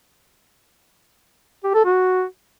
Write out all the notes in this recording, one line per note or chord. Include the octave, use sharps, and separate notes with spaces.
G4
A4
F#4